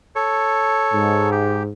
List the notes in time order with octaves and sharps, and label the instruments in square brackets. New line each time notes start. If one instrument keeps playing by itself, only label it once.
[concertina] A4 C#5
[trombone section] G#2
[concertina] G4